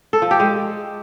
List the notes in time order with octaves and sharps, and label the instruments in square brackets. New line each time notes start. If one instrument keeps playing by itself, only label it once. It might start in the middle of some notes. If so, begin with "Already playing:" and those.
[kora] A4
F3
G4
G#3